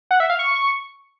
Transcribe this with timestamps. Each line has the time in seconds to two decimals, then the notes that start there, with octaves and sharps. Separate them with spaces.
0.11 F#5
0.20 E5
0.30 F5
0.39 C#6